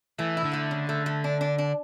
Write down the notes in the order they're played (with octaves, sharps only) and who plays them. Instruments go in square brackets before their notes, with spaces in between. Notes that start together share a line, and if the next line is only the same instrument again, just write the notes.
[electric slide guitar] E3 [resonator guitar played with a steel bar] A3
[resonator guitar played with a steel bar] E4
[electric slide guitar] D3
[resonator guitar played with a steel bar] A3
C#3
A3
A3
D4
D4
D4